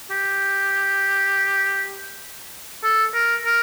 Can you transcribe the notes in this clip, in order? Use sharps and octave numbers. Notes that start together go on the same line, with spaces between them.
G4
A4
A#4
A#4